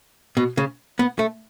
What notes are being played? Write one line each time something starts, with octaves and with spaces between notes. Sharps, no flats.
B2
C#3
B3
A3